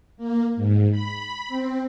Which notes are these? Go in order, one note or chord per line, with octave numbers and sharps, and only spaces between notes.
A#3
G#2
B5
C4